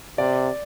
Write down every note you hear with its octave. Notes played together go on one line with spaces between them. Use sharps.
C3 D5